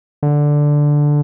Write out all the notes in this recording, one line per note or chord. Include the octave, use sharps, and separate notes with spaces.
D3